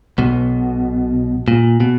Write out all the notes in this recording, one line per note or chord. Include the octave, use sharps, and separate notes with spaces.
B1 B2
A#2
B2